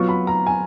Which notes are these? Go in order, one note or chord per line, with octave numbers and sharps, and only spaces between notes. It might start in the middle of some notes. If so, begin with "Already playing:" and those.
Already playing: F#3 B3 F4 C#6
B5
A#5
G#5